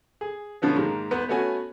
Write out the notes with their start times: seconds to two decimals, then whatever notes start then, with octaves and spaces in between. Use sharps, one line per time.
0.21 G#4
0.62 B2 D3 F3 B3 C#4
0.77 G#2 D#3 G#3 A#3
1.11 E1 B3 B4 C5
1.29 A3 B3 C#4 F#4 G#5